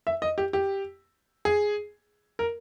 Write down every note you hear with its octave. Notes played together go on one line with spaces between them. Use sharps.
E5
D#5
G4
G4
G#4
A#4